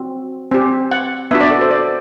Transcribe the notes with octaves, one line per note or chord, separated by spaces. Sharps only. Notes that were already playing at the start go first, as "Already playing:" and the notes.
Already playing: C4 F#4
C4 G4
F#5
B3 D4 F#4 E5
D5
A4
C5
D5